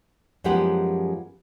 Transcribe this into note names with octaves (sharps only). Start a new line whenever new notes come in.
F#2 F3 G#3 B3 G4 F#5